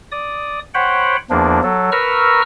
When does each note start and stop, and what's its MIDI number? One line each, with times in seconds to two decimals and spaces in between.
0.12 0.59 74
0.12 0.59 87
0.74 1.16 72
0.74 1.16 73
0.74 1.16 78
0.74 1.16 79
0.74 1.16 83
1.30 1.61 40
1.30 1.61 53
1.30 1.61 58
1.30 1.61 62
1.63 1.90 54
1.63 1.90 69
1.92 2.42 70
1.92 2.42 71
1.92 2.42 82
1.92 2.42 85
1.92 2.42 88
1.92 2.42 89